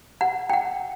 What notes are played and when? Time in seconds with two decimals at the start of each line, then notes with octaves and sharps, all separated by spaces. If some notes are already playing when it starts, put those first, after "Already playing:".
0.21 F#5
0.50 G5
0.53 F#5